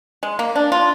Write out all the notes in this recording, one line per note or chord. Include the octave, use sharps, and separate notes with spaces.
G#3
A#3
D4
F4